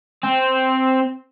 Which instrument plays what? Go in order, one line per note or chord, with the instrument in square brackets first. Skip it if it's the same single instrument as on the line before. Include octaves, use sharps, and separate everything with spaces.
[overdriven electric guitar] C4